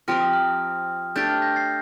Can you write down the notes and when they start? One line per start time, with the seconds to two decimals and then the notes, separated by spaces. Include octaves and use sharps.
0.08 F3 C4 G4 A#4 F6
0.20 D#6
0.33 F6
1.16 A3 D4 G4 G6
1.29 F6 A6
1.42 G6 A#6
1.56 A6 C7